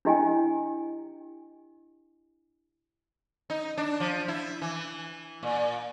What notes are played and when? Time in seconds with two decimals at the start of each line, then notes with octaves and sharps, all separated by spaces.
0.05 D4 E4 G4 D#5 G5 G#5
3.50 D#4
3.78 D4
4.00 F3
4.28 E4
4.62 E3
5.43 A#2